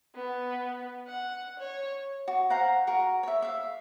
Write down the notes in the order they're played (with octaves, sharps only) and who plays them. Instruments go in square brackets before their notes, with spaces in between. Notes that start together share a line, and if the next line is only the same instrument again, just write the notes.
[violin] B3
F#5
C#5
[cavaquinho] F#4
C5 F5 F#5 A#5
F#4 A#4
C#5 E5
E5 F5